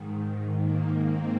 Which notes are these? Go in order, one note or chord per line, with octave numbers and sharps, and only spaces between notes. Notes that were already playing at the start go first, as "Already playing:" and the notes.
Already playing: G#2 D#3
A#3
C4